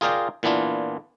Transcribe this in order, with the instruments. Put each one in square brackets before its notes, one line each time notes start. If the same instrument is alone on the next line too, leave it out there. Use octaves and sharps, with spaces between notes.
[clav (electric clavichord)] F4 G#4 A#4 D5 F5 G5
A#2 E3 B3 D4 F4